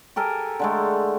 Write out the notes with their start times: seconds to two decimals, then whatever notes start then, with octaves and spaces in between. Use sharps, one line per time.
0.16 G4 A4 A#4 G#5
0.60 D3 G#3 A3